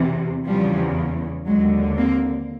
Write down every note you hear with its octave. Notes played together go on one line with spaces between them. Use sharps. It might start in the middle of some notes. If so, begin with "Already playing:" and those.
Already playing: E2 C3 E3
E2 C#3 E3 F3 G3
D#2 D3 F#3 G#3
A#3 C4